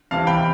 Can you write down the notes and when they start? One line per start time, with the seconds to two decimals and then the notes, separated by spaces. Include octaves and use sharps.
0.11 E2 C3 E3 F5 A5
0.27 G5 B5